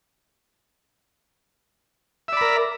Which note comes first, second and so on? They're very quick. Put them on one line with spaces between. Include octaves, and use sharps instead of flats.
E5 D5 B5 A#4